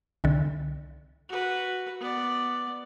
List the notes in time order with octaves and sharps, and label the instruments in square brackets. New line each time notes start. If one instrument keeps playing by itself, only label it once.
[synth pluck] C2 D3
[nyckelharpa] F#4 B4
B3 D5